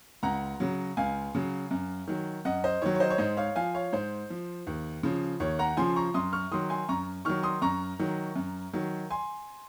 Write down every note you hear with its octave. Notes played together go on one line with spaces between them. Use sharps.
C#2 F#5 A#5
C#3 F#3
C#2 F5 G#5
C#3 F#3
F#2
D#3 F#3
F#2 D#5 F#5
C5 D#5
D#3 F#3 C#5
C#5
C5 D#5
C#5
G#2 C5 D#5
C#5 F5
F3 F5 G#5
C#5 F5
G#2 C5
F3
D#2
C#3 F3
D#2 C#5
F#5 A#5
C#3 F3 G#5 C6
A#5 C#6
F#2 C6 D#6
C#6 F6
D#3 F#3 C6 D#6
G#5 C6
F#2 A#5 C#6
D#3 F#3 C#6 F6
C6 D#6
F#2 A#5 C#6
D#3 F#3
F#2
D#3 F#3
G#5 C6